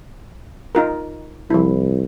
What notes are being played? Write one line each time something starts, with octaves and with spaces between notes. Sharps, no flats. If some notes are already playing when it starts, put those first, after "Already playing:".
D#4 F4 A#4
C2 F3 E4